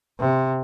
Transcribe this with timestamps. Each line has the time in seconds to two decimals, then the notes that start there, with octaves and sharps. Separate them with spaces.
0.20 C3